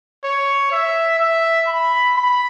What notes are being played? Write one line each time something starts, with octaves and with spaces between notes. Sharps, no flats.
C#5
E5
E5
B5
B5